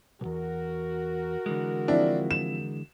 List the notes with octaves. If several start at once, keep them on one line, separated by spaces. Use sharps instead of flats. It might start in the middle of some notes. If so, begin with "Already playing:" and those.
B1 E2 F#4 A#4
D3 E3 G#3
F3 C4 D4 E4
E7